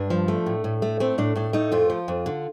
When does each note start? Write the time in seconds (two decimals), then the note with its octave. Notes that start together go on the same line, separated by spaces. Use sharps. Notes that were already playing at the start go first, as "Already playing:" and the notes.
Already playing: G2 D4
0.10 F3
0.28 A3
0.46 A2
0.64 A2
0.82 A3
1.00 A3 C4
1.18 A2 D4
1.36 A2 D4
1.53 A3 D#4
1.72 F2 F4
1.90 F3
2.08 F2
2.26 D3